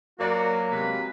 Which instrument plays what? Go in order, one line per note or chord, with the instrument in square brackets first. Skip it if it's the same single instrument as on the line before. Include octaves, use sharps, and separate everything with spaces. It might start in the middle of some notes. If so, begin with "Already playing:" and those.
[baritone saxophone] F#3 [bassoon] A#3 [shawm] F#4 [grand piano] A#4 D5 A#5
[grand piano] C3 G#3 [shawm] B4